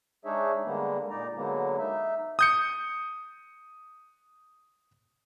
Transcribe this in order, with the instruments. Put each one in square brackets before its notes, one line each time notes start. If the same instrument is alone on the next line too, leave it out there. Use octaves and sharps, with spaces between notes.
[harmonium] G#3 D4 D#4 G#4 C#5 E5
D3 G3 G#3 A#3 B3
A#2 D#4 D5 A#5
D3 F#3 G#3 A#3 B3
D#4 E5
[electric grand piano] D#6 G6 C#7